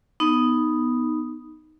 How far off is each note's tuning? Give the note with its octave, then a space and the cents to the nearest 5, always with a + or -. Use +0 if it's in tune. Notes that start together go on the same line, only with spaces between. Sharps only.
B3 +0 D#4 +0